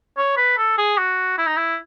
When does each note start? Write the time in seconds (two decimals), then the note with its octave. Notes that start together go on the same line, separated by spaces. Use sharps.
0.18 C#5
0.37 B4
0.58 A4
0.78 G#4
0.98 F#4
1.38 E4
1.47 D#4
1.57 E4